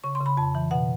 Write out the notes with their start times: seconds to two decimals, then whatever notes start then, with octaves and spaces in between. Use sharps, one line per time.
0.04 C#3 C#6
0.15 C6
0.21 C#3
0.26 B5
0.37 F2 A5
0.55 E3
0.71 B2 F#5